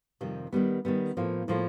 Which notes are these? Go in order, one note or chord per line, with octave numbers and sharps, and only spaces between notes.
F2 C3 D#3 G3
D#3 G3 B3
D#3 G3 B3
A2 F3 A#3
A2 F3 A#3